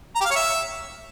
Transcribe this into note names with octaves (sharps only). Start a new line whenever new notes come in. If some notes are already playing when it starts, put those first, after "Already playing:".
A#5
G4
F5
C#5
E5